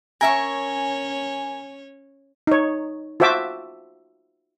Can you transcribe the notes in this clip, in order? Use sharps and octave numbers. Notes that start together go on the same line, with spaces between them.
C#4 A#4 C#5 E5 G#5 C#6
D#4 C#5
F4 F#4 C5 E5 A5 D6